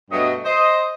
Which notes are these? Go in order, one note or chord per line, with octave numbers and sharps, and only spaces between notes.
G2 B2 F#3 A3 D#5
C5 D#5